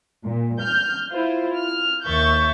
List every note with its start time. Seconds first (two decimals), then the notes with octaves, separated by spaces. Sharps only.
0.24 A#2
0.60 F6 G6
1.12 E4 F4 C5
1.57 F6
2.06 D#2 E5 C#6 G6 A6